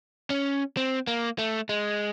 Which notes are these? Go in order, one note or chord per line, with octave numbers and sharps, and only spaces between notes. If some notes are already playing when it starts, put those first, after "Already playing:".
C#4
C4
A#3
A3
G#3